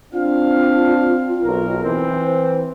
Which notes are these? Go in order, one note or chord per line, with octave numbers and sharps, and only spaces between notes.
C4 D4 F4 F5
B1 A#4
E3 C4
C5